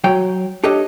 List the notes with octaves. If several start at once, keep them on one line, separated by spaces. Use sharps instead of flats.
F#3 C#5 G5
D4 G4 A4 C#5 D#5